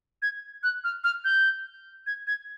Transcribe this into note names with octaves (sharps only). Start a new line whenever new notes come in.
G#6
F#6
F6
F6
G6
G#6
G#6